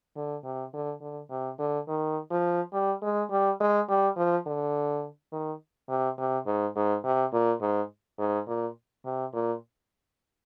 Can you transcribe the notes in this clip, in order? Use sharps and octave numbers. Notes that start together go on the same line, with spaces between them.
D3
C3
D3
D3
C3
D3
D#3
F3
G3
G#3
G3
G#3
G3
F3
D3
D#3
C3
C3
G#2
G#2
C3
A#2
G#2
G#2
A#2
C3
A#2